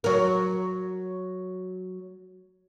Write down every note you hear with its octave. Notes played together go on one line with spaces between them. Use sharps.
F#3 A#4